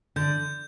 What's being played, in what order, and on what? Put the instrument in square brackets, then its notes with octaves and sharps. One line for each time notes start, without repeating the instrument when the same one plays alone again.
[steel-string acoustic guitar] D3 [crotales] G6